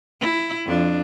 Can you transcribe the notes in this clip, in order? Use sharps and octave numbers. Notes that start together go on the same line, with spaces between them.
E4
F2 D4